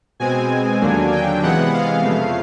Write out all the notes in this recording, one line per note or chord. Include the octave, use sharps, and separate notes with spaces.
B2 G#3 C4 G#5
D#2 D3 F#3 A#3 D4
G5
C3 E3 G#3 B3 F#5
F5
F2 C#3 F3 A3